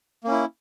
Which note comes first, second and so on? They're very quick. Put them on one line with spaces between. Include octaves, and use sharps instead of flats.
A#3 C#4 E4